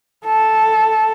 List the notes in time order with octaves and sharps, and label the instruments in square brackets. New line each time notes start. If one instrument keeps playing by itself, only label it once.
[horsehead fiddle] A4